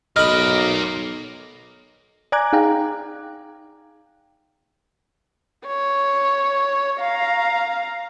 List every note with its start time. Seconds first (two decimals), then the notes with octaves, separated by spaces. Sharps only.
0.16 B1 D#4 A#4 D5 B5 F6
2.32 D5 G#5 A#5 D6 F#6 G#6
2.53 D#4 G#4 F5 G5 A#5
5.67 C#5
7.00 F5 A#5